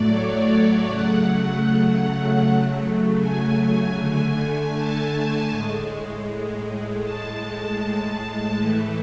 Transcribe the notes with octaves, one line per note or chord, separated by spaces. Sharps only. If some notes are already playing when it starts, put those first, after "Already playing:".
Already playing: A2 F#3 A3 D5
C#5
C#3 F#3 A3 F#5
C#3 F#3 A3
G#5
D3 A3
A5
A2 G#3
A2 G#3 A5
A2 E3 A3